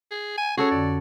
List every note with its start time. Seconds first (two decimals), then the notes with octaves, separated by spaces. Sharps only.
0.11 G#4
0.38 G#5
0.57 C#4 F#4 G#4 A4 C#5
0.71 F2 D3 D5